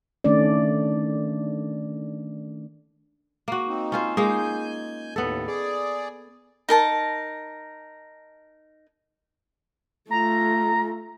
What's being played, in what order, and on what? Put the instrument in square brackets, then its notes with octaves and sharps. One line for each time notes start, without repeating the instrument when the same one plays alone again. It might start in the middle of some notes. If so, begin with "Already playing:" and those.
[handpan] D#3 A3 C#4 D4 D5
[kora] A#3 F#4
[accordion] C4 D#4
[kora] C#4 F4 C5
[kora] G#3 A#3 D#4 [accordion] G#5 G6
[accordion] D#2 A2 [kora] B3 A4
[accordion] G#4 D5
[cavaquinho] D#4 A#4 A5
[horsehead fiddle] A3 F4 [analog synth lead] A#5